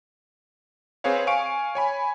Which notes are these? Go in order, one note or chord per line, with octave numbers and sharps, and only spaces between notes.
C4 G#4 B4 C#5 F5
F5 G#5 C#6 D7
C#5 G#5 B5